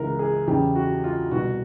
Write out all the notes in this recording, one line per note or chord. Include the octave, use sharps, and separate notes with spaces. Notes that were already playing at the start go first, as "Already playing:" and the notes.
Already playing: C#2 C#3 E3 A#4
G#4
E2 C#3 E3 G4
F#4
F4
C2 B2 F#4